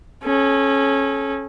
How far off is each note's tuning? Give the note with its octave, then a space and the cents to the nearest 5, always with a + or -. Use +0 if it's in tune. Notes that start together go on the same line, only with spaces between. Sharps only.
C#4 -20 A4 -40